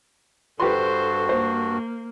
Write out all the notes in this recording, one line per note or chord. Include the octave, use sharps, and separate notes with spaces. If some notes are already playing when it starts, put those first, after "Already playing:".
G2 F#4 G4 A4 B4 C5 C6
A#3 C5